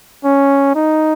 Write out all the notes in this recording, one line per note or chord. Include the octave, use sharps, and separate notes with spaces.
C#4
D#4